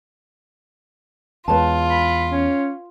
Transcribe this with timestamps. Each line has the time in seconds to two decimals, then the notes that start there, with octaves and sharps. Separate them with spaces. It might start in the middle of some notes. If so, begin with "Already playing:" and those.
1.48 E2 G#3 F4 B4 C#5 A5
1.90 B5
2.31 C#4